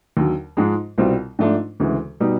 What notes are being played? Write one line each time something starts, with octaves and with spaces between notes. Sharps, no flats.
D#2 D3 F#3
G#2 F3 G#3
C2 B2 G3 C4 F4
G#2 F3 A3 D4
D2 C#3 E3 G#3
B2 G3 B3 D#4